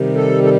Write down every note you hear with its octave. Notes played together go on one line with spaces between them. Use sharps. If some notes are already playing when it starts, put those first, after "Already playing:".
Already playing: C3 D#3 G3
A4
A4